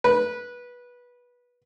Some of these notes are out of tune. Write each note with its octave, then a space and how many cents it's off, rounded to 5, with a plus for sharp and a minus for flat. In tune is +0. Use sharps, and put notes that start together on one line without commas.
B4 -20